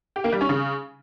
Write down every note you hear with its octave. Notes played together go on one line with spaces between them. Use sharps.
G4
A#3
G3
C#4
C#3